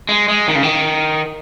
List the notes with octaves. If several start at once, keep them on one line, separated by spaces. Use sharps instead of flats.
G#3
G#3
D#3
C#3
D#3